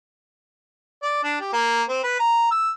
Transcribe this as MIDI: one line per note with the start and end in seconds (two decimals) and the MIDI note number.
1.02 1.20 74
1.23 1.35 62
1.40 1.51 67
1.53 1.82 58
1.89 1.99 60
2.03 2.15 71
2.20 2.47 82
2.51 2.71 88